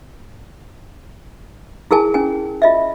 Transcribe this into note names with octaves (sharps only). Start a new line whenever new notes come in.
E4 G#4 A#4 G#5 A5
C#4 G#5
F4 D#5 E5